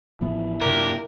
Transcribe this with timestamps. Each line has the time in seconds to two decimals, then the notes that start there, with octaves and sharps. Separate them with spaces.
0.21 A1 F3 B3 E4
0.61 F#2 C3 A#3 D4 G4 A#4